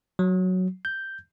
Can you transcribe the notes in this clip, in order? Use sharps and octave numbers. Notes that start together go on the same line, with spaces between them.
F#3
G6